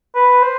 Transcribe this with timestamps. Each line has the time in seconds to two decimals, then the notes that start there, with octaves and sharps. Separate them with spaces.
0.15 B4
0.43 C5